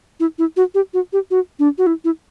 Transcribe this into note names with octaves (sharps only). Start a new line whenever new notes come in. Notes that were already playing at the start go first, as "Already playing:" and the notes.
E4
E4
F#4
G4
F#4
G4
F#4
D4
F#4
E4
E4